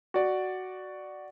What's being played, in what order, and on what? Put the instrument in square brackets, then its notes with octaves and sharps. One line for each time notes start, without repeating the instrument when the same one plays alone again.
[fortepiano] F#4 D5